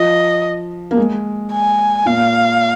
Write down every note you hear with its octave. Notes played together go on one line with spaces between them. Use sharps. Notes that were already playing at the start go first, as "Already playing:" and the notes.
Already playing: F3 D#5
A#3
G#3
G#5
A#2 F5